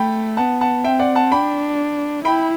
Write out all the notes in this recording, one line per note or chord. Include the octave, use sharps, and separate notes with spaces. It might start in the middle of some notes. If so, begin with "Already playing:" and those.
Already playing: A3 G5 B5
B3 F#5 A5
F#5 A5
C4 E5 G5
D5 F#5
F#5 A5
D4 G5 B5
E4 G5 B5